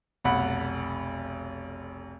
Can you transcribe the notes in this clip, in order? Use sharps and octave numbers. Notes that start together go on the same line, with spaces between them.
F1 B1 F#5 B5